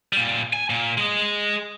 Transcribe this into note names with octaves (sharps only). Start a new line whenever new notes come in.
A#2 G3
G#5
A#2
G#3 D#5